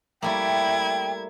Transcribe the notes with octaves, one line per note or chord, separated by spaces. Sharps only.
G3 A3 A#3 E4 G5 G#6